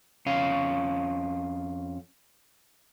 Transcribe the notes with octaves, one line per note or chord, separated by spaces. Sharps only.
F2 C#4 F5